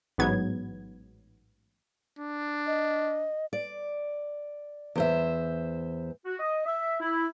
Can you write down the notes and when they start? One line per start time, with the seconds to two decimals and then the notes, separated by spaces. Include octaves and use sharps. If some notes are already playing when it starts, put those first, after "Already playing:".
0.18 A1 G#2 F#3 B3 G#6
2.18 D4
2.67 D#5
3.53 D5
4.95 E2 C5 E5
6.26 F#4
6.40 D#5
6.66 E5
7.01 E4